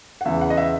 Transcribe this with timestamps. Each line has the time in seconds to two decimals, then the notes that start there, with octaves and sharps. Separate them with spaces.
0.21 F#5
0.25 E2 C#3 E3 E5
0.41 F#5
0.50 D#5
0.57 E5